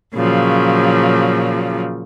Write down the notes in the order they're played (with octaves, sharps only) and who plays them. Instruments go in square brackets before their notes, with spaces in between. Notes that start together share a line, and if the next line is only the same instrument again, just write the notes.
[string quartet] A#2 C#3 F3 F#3